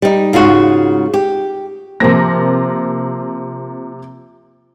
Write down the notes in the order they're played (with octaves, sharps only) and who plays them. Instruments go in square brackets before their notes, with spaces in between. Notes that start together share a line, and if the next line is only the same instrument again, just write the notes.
[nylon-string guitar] G3 D#4
G#2 C#3 F4 F#4
G4
[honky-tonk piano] C3 A#3 A#6 [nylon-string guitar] F3 C4